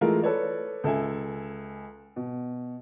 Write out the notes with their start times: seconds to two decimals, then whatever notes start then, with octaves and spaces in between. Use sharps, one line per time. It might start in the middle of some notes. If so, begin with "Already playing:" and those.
0.01 E3 G#3 A3 F4 A#4
0.22 A4 B4 C#5 D5
0.84 C#2 A4 E5 G#5
2.16 B2